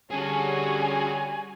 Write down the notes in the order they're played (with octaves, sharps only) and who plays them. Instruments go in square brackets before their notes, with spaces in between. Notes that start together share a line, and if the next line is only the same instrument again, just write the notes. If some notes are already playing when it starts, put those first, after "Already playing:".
[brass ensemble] D3 G3 [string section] C#4 F#4 [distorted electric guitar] G#4 A4 [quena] G#5